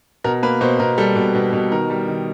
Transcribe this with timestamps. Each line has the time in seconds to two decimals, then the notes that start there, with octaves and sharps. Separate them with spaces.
0.24 B2 A#4
0.43 A#3 B4
0.61 B2 C5
0.79 B2 A#4
0.98 G3 A4
1.16 B2
1.35 B2
1.53 B2
1.71 D#3 A#4
1.90 G3
2.08 D#3